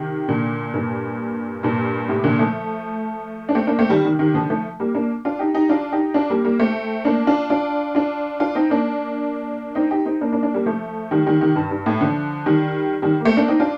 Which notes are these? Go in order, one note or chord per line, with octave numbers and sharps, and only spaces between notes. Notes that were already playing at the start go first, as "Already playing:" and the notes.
Already playing: C3 D#3
A#2 D3
G2 A#2
G2 A#2
A2 C3
A#2 D3
F3 A3
D4
A3 C4
A#3 D4
A3 C4
D#3 G3
C3 D#3
C3 D#3
D3 F3
F3 A3
G3 A#3
A#3 D4
D4 F4
D#4 G4
D#4 G4
D4 F4
D#4 G4
D4 F4
G3 A#3
G3 A#3
A3 C4
A#3 D4
D4 F4
D4 F4
D4 F4
D4 F4
C4 D#4
A#3 D4
C4 D#4
D#4 G4
C4 D#4
A#3 D4
A#3 D4
A#3 D4
G3 A#3
F3 A3
D#3 G3
D#3 G3
C3 D#3
G2
G2
A2
D3 F3
D#3 G3
D#3 G3
A#3
A3 C4
A#3 D4
C4 D#4
D4 F4